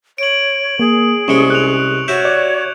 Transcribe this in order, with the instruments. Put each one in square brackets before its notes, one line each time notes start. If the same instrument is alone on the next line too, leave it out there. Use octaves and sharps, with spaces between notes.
[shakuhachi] C#5 [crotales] D7 F#7
[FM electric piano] A#3 [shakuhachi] G#4
[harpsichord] C2 G#3 G5 [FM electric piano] C#4 [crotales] C#6 C#7
[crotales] F#6 F7
[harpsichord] F#4 E5 [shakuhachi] C#5 [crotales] G6
[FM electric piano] D5